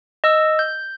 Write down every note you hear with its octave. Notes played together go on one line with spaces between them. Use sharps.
D#5 E6
G6